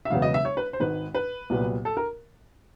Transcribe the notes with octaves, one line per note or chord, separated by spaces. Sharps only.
E5
E1 E2 C#3 F#3 B3 F5
D#5
E5
C#5
B4
C5
G#1 G#2 D#3 B4
B4
C2 A#2 F#3 B3
A4
A#4